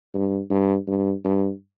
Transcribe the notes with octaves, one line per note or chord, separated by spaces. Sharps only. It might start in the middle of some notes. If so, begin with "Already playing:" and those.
G2
G2
G2
G2